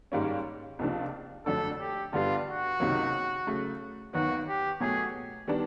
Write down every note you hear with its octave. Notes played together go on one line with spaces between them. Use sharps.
G#2 D#3 G3 A#3 C#4
C#2 C3 F3 A#3 D4
F2 D3 F#3 A3 D4 A4
G4
G2 D3 G3 B3 F4
F#4
C#2 C3 D#3 F#3 A#3
C#3 F#3 A3
D#2 D#3 F#3 B3 F#4
G4
B2 F#3 A3 G#4
D#3 G3 B3 D4